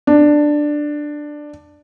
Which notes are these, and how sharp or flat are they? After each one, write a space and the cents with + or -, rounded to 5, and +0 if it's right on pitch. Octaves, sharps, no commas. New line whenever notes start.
D4 +10